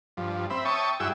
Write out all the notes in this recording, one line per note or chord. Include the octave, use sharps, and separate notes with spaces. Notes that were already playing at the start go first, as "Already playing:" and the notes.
G2 F3
C4 E5 B5
C#5 E5 G5 A5 C#6 D#6
G2 E4 F#4 G#4 G5 E6